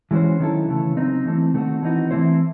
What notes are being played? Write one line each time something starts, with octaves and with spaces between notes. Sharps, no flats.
E3 G#3 C#4 F#4 C5
D#3 F#3 C#4 E4 A4
C#3 E3 A3
C#3 F#3 C4 D#4
E3 A3 C4
D#3 A3 C4 D#4 F#4
E3 C4 D#4 F#4
E3 A3 C4 E4 C5